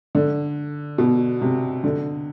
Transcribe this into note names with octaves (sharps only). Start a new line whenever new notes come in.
D3
B2
C3
D3